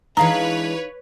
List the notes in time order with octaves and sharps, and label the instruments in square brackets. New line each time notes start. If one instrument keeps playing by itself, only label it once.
[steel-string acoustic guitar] E3 G#3 D4 [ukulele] D#4 F5 [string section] B4 C#5 [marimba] A#5